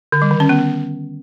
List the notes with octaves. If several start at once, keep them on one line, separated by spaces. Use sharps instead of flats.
D3
G3
D#3
C#4
B3